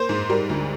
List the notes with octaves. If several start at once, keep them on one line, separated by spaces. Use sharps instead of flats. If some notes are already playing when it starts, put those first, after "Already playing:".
Already playing: A#3 C5
G#2
G3 A#4
D2